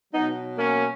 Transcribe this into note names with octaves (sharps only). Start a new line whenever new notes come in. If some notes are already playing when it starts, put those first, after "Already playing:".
B2 F#3 B3 D#4
A#3 C#4